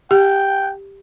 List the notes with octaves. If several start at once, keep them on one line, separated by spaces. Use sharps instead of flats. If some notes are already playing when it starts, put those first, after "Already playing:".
G4 G5